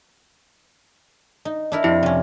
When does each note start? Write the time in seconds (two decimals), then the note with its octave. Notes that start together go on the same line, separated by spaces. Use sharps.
1.45 D#4
1.72 D4 E4 A#4
1.84 F2 E4 G4
2.03 C3 C#4